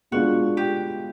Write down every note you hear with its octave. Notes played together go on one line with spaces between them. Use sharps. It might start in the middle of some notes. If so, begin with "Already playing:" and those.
B2 G#3 B3 D4 F4 F#4
G4